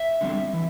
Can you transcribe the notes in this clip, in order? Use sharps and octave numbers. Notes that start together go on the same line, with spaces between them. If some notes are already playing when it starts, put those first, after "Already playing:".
Already playing: E5
D3 G3 C4
E3